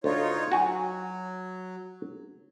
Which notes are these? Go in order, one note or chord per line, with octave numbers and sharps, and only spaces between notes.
D2 D#4 F4 C#5
F#3 F#4 G#5